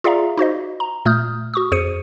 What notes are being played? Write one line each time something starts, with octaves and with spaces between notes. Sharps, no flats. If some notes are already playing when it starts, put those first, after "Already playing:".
F4 G#4 D5 E5 F5 A#5
D#4 F#4 C5 D#5
A#5
A#2 A3 D#6 F6 G6
F#4 C#6 D#6
F2 G#4 C5 C#7 D#7